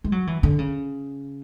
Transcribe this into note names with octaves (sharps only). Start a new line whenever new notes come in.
G#3
F#3
E3
D3
C#3